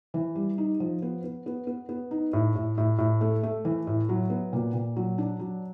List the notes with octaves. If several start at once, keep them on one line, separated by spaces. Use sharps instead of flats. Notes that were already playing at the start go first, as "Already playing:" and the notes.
E3
G3
D#4
F3
B3
B3
B3
B3
B3
D#4
A2
A2
A2
A2
A3
A3
E3
A2
F#3
B3
A#2
A#2
F#3
D4
F#3